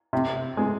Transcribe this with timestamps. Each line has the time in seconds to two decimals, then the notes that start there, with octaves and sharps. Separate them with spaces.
0.13 C3
0.57 G#3